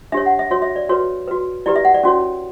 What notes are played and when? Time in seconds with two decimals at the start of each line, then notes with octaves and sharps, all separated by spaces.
0.12 D4 G4 C#5 E5
0.26 F#5
0.39 E5
0.51 F#4 C#5
0.62 E5
0.76 D5
0.89 F#4 B4 C#5
1.28 F#4 B4
1.66 E4 G4 B4 D5
1.76 E5
1.85 F#5
1.94 D5
2.03 C#4 F#4 C#5